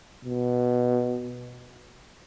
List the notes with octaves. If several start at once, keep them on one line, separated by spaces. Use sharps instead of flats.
B2